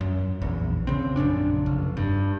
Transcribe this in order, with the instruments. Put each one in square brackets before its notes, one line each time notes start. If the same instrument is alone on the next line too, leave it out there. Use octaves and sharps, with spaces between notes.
[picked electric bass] F#2
A#1 E2
C#3 C4
A#1 F#2 C#3 D4
F1
G2